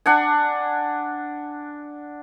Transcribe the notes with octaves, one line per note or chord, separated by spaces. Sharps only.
D4 F#5 G#5